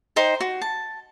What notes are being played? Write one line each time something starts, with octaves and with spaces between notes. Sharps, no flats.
D#4 C5 G5
F#4
A5